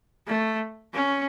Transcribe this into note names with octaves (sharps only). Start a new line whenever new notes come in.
A3
C#4